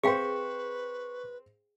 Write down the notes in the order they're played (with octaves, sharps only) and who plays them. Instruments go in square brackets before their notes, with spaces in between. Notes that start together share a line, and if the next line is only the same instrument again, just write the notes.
[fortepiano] C4 C5 [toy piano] G#4 F5 G5 [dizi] B4 [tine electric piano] C#6